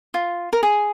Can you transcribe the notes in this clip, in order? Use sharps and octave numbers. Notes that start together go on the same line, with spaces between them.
F4
A#4
G#4